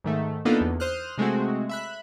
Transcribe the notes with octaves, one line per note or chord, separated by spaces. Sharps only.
G#2 D#3 A3
A#3 B3 D4 D#4 F4 A4
E2
C5 D#6 F6 F#6
C3 G#3 A3 C4 F#4
E5 B5 F#6